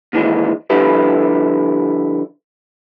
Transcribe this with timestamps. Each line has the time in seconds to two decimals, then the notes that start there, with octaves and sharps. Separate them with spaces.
0.13 A#2 D#3 E3 G#3
0.70 D3 F3 G3 E4 G4 B4